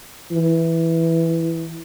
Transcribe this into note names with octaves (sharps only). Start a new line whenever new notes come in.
E3